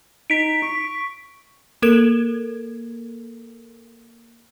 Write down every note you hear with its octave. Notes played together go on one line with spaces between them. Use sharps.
D#4 B6 D7
C#6
A#3 A4 A#4 G#6 D7 E7